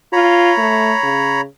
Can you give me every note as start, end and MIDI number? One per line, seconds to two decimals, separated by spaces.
0.13 0.52 65
0.13 1.41 73
0.13 1.41 82
0.13 1.41 83
0.58 0.93 57
1.03 1.45 49